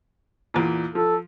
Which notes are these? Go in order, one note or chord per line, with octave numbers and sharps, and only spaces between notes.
E2 A#2
F3 A4